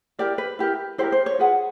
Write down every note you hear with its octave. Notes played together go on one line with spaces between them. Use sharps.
E4 G4 A#4 D5
B4
E4 G4 A#4
E4 G4 A#4 C5
C5
C#5
F4 G#4 B4 F#5